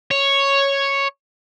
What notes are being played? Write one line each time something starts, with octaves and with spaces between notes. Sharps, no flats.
C#5